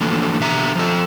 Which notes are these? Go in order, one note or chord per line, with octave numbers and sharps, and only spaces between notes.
D3 E3 F3 A3 A#3
B2 D3 E5 A#5
F3 A4